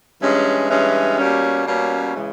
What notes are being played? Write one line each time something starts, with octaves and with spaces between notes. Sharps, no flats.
G2 E3 G#3 C#4
G2 E3 G#3 C#4
B2 G3 A#3 C#4
B2 G3 A#3 C#4
C#3 E3 G#3